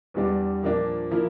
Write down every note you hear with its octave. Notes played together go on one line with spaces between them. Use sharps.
E2 E3 G3 D4
A#2 F3 A#3 D4
F3 A#3 E4 A#4